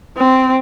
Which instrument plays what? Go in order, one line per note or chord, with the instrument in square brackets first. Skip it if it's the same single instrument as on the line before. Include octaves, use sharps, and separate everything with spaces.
[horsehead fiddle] C4